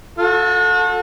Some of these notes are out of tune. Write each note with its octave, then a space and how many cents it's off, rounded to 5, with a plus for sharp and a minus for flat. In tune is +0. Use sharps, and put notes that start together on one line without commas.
F#4 -40 A4 +0